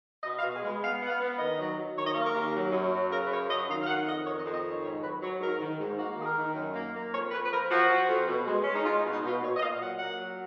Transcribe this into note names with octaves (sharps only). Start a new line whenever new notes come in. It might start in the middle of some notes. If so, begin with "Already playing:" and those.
B2 D#5
F5
B2
G#4
G#3
B4
B3 F5
B3 F#5
F5
B3
D#3 D#5
F#3
F#3
D#3 C#5
D#5
A#3 C#5
A#4
D#2
F#3
F#2
F#3
C#3 A#4
B4
F#2 C#5
F#3 D#5
D#3 F5
F5
D#3 F#5
F2 D#5
D#3 C#5
D#5
F2
D#5
D#3 C#5
G#2 C#5
F#3 B4
F#3 C#5
G#2 A#4
D#3
G#2
A#3 F#4
D#3 G#4
A#4
D#3
F#2
A#3
A#3
F2 C#5
F2 B4
B4
F3 A#4
F3 F#4
F3
F2
B2
G#3
G#3 C#4
D#4
G#3 F4
D#4
B2
D#4
B2 F4
A#2 C#5
D#5
A#2 F5
F#3 F#5
A#3 F#5
F#3